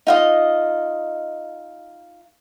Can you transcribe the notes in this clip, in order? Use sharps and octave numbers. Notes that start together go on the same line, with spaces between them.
D#4 F4 D#5